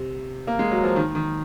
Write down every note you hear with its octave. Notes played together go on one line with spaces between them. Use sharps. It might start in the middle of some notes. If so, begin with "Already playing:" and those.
Already playing: C3
A#3
G#3
F#3
F3
D#3
D#3